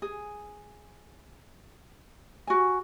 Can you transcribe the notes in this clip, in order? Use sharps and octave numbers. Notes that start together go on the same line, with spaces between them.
G#4
F#4 G#5